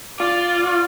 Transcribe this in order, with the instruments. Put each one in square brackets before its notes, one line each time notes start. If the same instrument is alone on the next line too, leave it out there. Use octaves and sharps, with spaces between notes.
[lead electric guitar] F4 [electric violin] D5